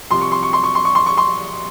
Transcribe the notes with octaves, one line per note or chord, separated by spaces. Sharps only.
C2 C3 F3 C6
C#6
C6
C#6
C6
C#6
C6
C#6
C6
C#6
C6